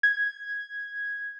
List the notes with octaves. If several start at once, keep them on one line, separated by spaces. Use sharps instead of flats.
G#6